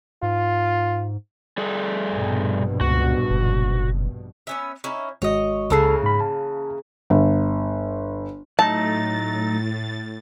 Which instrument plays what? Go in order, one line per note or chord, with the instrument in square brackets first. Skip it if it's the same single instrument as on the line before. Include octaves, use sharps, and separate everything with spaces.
[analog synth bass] G#2 [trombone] F4
[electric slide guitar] G3 G#4 A4
[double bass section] A#1 G2 B2
[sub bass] C#2 [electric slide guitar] F#4
[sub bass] F#1
[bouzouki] B3 C#4 E5
C#4 D#4 E4
[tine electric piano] G#1 G#3 F#4 [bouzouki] C#5 D#5
[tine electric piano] C#2 A4 C7 [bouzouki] C#3 E3 A#3
[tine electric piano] G#2 B5
A5
[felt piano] G1
[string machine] A2 A6 [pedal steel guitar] F#3 A3 D#4 [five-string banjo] A5